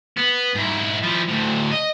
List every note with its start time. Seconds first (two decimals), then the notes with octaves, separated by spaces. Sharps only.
0.17 B3
0.55 G#2 E4
1.03 F3 E4
1.28 D2 A2
1.71 D#5